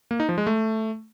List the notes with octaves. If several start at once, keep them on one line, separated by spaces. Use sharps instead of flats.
A#3
D#4
F3
G#3
A3